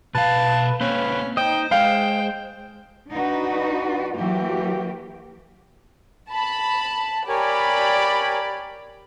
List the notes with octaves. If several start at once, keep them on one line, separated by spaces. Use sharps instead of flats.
B2 B4 F5 A5
A#3 C4 C#4 B4 C5
D#4 C5 D#5 G5
G#3 F5 G5
D4 D#4 F#4 B4
E3 F#3 A#3 F#4 G4
A5 B5
G4 A#4 C#5 D5 G#5 B5